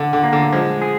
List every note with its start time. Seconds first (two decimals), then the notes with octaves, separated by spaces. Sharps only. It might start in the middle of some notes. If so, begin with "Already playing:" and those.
Already playing: D3
0.13 D3
0.23 A#3
0.33 D3
0.52 F3 G#3
0.82 G#4